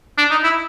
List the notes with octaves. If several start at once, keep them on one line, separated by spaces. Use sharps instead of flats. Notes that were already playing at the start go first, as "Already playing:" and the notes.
D4
D#4
E4